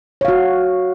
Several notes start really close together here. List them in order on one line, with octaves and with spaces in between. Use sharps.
C#5 F5 F#4